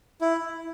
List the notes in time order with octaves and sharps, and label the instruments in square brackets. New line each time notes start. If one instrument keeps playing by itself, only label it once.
[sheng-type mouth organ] E4